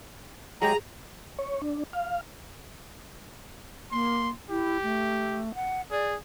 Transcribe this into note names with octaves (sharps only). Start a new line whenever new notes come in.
F#3 G#3 G4 G#4 A#5
C#5
D4
F5
A#3 C6
E4 G4
A3
F#5
G#4 D5